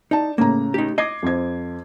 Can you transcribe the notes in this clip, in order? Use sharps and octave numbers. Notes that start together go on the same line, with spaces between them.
D#4 D5 A5
A2 C#3 A#3 A#5
D#4 G4
D#5 D6 G#6 C7
F2 C5 G#6